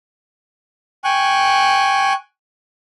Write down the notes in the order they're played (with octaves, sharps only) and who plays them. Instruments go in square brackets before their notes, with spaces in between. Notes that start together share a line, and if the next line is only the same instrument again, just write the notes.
[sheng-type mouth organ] G5 G#5 C#6 F#6